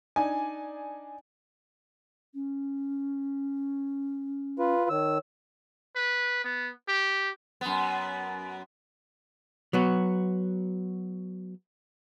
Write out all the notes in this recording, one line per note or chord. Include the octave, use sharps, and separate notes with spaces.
D4 D#4 G#5
C#4
F4 B4
D#3 C#5 E6
B4
B3
G4
F#2 B3
F#3 B3 F#4